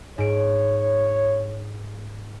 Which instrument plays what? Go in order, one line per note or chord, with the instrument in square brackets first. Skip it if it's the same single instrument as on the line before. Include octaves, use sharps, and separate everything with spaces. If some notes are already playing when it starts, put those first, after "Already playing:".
[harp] G#2 D7 [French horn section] C#5